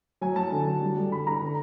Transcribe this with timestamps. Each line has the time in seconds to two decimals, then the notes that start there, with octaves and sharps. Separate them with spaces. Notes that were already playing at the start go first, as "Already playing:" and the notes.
0.21 F#3 G#5
0.36 F#3 A5
0.52 D3
0.66 D3
0.81 G3
0.97 G3
1.11 D3 B5
1.27 D3 A#5
1.41 D3